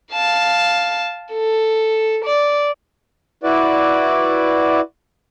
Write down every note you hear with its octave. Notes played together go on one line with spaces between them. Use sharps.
F5 A5
A4
D5
E4 F#4 B4 D5